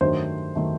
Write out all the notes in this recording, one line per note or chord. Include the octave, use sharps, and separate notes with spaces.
G2 D#3 F#3 A3 C5
D#3 F#3 A3